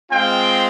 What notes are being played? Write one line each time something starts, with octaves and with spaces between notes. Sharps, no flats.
G#3 C4 F4 F5 G5